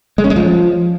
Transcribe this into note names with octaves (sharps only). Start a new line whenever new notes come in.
G#3
C#4
G#3
F3